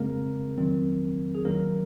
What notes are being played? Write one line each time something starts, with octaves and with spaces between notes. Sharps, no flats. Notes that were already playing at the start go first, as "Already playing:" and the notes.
Already playing: F2 C#3 G#3 A#3 C4 A#4
F2 D#3 F#3 C4
G#4
D#2 D#3 F#3 A#3 C#4 A#4